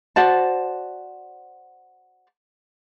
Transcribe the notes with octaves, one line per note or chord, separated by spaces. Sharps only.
F#4 C5 D5 A5